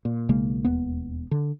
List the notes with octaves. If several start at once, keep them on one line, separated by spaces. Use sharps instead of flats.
A#2
B1 C#3 G#3 A#3
E1 D#2 B3
D3